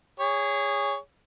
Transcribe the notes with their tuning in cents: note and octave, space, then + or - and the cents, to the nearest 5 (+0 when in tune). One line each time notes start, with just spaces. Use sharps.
G#4 -20 C#5 +15